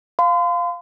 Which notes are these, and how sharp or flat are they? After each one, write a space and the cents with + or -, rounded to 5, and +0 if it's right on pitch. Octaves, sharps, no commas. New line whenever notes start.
F5 +0 C6 -40